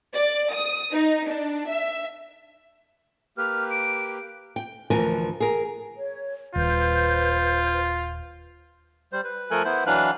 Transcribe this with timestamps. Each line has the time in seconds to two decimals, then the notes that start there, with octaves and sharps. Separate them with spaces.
0.15 D5
0.52 D#6
0.93 D#4
1.29 D4
1.70 E5
3.38 A#3 G4 B4 F6
3.71 D7
4.56 G5
4.90 D2 E3 F3 A#4 G#5
5.40 G#4 A#4
5.96 C#5
6.55 D#1 F4 B4 C5 G6
9.13 G3 C5
9.24 B4
9.51 F3 A3 A4 A#4 G#5 F#6
9.65 B3 E4 C5
9.86 E3 F#3 D4 B4 F5 F#6